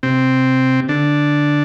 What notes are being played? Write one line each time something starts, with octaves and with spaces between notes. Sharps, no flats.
C3 C4
D3 D4